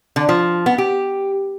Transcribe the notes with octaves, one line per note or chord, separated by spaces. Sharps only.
D3
F3
B3
G4